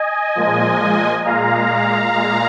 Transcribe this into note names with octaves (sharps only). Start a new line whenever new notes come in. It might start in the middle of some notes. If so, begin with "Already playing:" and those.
Already playing: D#5 G#5
A#2 F3 G#3
A#2 G#3 F5 A#5
A#2 G#3